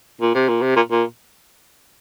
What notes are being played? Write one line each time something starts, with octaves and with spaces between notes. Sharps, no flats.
A#2
C3
A#2
C3
A#2
A#2